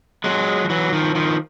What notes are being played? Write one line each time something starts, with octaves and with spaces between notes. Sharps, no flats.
F#3 G#3
F3
E3 F#3
D#3 F3
D#3 F3